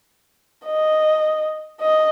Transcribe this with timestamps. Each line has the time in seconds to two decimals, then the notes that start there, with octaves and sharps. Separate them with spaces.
0.66 D#5
1.81 D#5